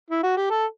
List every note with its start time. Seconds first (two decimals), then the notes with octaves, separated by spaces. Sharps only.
0.10 E4
0.23 F#4
0.37 G4
0.50 A4